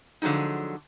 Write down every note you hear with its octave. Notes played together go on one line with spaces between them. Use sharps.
D3 F3 F#3 G#3 D#4